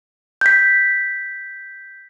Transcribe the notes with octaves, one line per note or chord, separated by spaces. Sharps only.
G6 B6